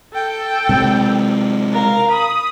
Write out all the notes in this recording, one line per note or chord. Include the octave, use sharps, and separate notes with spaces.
A4 G5
C3 G#3
A#4 F5
B5 D#6